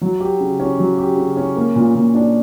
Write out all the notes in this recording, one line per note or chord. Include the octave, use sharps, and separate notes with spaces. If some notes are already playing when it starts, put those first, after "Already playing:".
F#3
G4
C#3
C#4
F#3
G4
C#3
C#4
A#3
A#2
A#2
D4